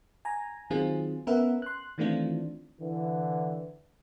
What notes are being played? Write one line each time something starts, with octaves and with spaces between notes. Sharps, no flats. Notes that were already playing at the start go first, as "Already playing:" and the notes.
G#5 A#5
D#3 F#3 C4 F4 G#4
B3 C#4 A#4 B4 E5 F#5
C6 F#6
D#3 E3 A3 C4 D4 F4
D3 E3